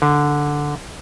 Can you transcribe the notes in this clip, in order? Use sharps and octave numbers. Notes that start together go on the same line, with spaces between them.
D3